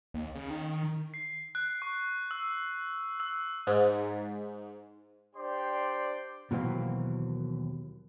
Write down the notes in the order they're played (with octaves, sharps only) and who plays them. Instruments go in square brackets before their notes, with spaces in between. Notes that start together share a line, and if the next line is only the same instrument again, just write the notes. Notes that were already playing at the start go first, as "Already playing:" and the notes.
[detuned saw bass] D#2
C#3
D#3
[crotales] C7
F#6
C#6
E6
E6
[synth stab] G#2
[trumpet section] D4 G4 C5 D5 G5 C6
[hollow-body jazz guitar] D#2 B2 E3 F#3 A#3 C4